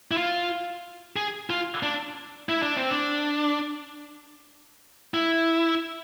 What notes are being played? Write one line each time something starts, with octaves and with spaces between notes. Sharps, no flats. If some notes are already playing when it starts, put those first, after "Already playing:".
E4
F4
G#4
F4
D4
E4
D4
C4
D4
E4